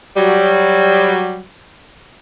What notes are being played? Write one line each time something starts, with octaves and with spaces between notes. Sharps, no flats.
F#3 G3